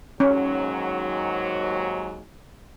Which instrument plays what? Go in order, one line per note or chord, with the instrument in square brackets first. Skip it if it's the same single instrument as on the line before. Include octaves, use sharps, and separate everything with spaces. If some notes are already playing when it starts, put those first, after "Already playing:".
[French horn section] D#2 G#2 F#3 [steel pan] C#4